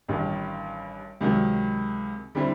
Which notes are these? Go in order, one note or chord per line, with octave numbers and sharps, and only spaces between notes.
A1 G2 D#3
C#2 C3 D#3 F#3
D3 G3 C4 E4